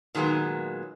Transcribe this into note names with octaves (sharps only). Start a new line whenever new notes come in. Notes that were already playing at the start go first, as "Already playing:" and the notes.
A#2 D#3 F#3 G#3 B3